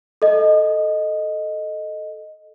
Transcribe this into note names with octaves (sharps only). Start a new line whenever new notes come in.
A4 D#5